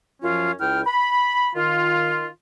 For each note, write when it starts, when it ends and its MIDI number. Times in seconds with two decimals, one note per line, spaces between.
0.22 0.51 42
0.22 0.51 53
0.22 0.51 61
0.22 0.51 65
0.60 0.81 37
0.60 0.81 64
0.60 0.81 79
0.60 0.81 89
0.86 1.48 83
1.55 2.26 51
1.55 2.26 65